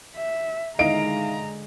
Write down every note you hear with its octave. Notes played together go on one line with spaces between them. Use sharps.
E5
D3 D#3 G#3 E4 D#5 F5 A#5 D7